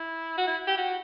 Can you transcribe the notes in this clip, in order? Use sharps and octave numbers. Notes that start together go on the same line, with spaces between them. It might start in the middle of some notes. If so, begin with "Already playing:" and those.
Already playing: E4
F#4
E4
G4
F#4